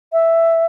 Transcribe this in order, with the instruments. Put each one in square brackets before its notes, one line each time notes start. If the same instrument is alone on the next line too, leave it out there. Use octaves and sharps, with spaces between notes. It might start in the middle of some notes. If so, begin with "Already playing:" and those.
[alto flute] E5